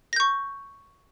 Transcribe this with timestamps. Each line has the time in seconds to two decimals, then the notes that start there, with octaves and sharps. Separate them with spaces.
0.13 A#6
0.16 G6
0.20 C#6